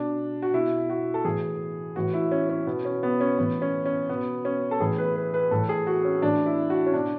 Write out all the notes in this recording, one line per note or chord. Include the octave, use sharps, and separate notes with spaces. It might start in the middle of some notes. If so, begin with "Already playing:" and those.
Already playing: B2 D4
F#4
B2 E4
F#4
A4
A2 E3 G#4
A2 E3 F#4
E4
C#4
C#4
B2 B3
C#4
B3
C#4
A2 E3 B3
C#4
C#4
B2 B3
C#4
A4
A2 E3 G#4
B4
B4
B4
A2 E3 A4
G#4
F#4
C#4
A2 E3 D4
E4
F#4
C#4
B2 D4